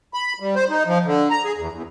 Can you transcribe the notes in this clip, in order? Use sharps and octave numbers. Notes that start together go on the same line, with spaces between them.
B5
G3
C5
D#4
F3
D3
A#5
G#4
E2
E2